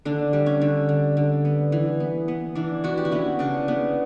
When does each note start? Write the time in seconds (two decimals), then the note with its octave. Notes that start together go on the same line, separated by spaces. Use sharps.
0.05 D3 D4
0.33 G3
0.46 C#4
0.61 D3
0.89 D3
1.17 D3
1.45 B3
1.72 E3
2.00 B3
2.28 B3
2.55 E3 D4
2.84 B3 D4 F#4
2.97 G4
3.05 F#4
3.12 B3 C#4 E4
3.39 C#3 D4
3.68 B3